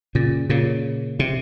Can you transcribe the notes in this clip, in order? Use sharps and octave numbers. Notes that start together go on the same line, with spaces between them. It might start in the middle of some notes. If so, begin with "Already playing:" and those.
A#2 C#3
A#2 C#3
C3